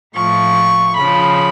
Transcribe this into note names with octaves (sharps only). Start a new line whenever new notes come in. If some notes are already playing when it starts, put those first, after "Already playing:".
A2 F3 C#6
C#3 F3 B5